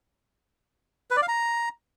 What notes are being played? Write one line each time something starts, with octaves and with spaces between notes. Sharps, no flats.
B4
D5
F5
A#5